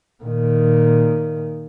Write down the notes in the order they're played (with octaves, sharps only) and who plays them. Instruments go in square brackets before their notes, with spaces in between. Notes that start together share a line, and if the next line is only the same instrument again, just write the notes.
[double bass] A#2 D#3